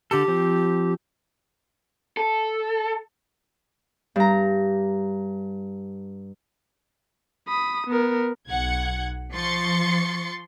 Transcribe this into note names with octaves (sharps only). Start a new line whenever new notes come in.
D3 G4 A4
F3 C4
A4
G2 A#5
B5 D#6
B3 A#4
B1 F#5 G#6
F3 C6 C#6 A6 C#7